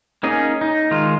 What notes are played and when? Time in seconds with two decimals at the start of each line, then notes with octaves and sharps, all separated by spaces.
0.23 A#3 C#4 D#4 G#4
0.61 D#4
0.91 D#3 G#3 F4